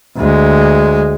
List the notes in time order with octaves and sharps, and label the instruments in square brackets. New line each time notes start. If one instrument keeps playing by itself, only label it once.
[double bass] D2 G#3